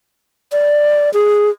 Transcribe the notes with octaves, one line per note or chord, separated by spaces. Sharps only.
D5
G#4